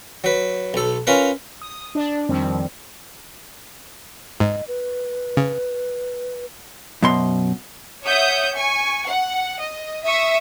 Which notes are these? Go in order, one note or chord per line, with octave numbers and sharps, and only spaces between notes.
F#3 B4
B1 A4
C#4 F4 A#4 B4
D#6
D4 D5
F2 D#3 F3 G3 C4
G#2 D#5
B4
C#3
F#2 B2 C6
C#5 E5 F#5 D#6 G6
G#5 C#6
F#5
D#5
E5 C#6 D#6